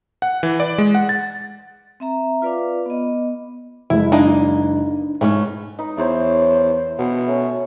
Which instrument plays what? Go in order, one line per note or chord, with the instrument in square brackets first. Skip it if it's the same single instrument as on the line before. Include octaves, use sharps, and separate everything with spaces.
[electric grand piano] F#5
E3
D5
G#3
F#5
A6
[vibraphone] C4 E5 A#5
F4 B4 D5 F5 D6
B3 D#5
[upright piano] F#1 G#3 [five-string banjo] E4
[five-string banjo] E3 A#3 D#5 [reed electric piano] D4 D#4
[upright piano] G#2 [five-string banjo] E3 A3 C#4
[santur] D#4 B4
[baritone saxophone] E2 [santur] C5 C#5 E5
[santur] C5 E6
[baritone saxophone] B2 [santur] B3
[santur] A3 C#4 A#4